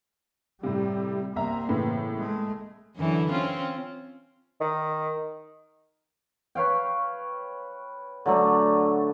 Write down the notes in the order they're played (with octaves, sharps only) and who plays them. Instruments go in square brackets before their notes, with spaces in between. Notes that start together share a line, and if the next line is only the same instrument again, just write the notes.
[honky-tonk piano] A2 C3 [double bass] G3
[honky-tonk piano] C2 E5 A#5 [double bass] A#3 C4
[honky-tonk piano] A2 C#3 E3
[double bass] G#3 A3
[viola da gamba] F#2 D3 E3
C4 C#4 F4
[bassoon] D#3
[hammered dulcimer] B4 C#5 F5 G5
D3 F#3 A3 D4